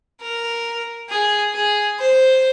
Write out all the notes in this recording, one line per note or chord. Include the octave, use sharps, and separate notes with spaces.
A#4
G#4
G#4
C5